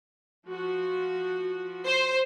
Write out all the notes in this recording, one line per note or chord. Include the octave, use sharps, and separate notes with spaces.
F3 F#4
C5